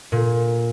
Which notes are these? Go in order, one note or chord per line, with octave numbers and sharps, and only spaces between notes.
A#2